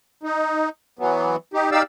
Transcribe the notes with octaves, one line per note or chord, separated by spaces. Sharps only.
D#4
E3 F#3 B3
D#4 G4
D#4 G4 D5 F5 E6